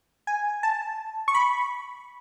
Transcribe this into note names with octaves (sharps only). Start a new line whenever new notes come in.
G#5
A5
C#6
B5